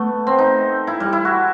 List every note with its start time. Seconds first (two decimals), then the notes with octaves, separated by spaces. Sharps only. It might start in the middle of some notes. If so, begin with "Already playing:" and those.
Already playing: A3 B3
0.27 C4
0.38 D#4
0.87 E4
1.00 G3
1.13 E4
1.25 F#4